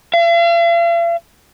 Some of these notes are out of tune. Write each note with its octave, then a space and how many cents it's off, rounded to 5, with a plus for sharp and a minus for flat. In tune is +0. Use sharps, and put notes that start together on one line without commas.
F5 -45